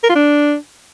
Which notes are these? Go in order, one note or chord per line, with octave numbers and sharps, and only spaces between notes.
A#4
F4
D4